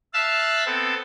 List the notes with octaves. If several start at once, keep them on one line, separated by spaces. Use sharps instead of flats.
E5 F5 A5 E6 F#6
B3 C4 A4